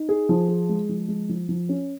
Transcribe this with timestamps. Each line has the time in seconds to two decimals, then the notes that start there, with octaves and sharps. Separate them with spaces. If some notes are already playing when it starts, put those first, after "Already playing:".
Already playing: D#4
0.09 G#4
0.29 F3
0.48 G#4
0.69 G#3
0.89 F3
1.08 G#3
1.29 F3
1.49 F3
1.69 C#4